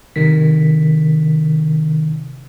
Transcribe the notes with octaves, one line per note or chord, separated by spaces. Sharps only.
C3 D#3 B6